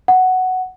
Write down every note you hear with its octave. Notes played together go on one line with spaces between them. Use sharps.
F#5